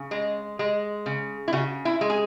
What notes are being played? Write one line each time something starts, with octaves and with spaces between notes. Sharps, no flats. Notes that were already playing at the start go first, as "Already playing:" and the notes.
Already playing: C#3
G#3
G#3
C#3
E4
C#3 F#4
E4
G#3
G#4